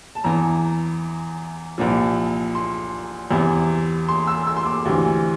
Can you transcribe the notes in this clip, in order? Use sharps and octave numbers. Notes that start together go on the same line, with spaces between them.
A5
E2 E3 A#5
C2 A#2 F3
C6
E2 C3 E3
C6
E6
E6
C6
D6
D2 C3 E3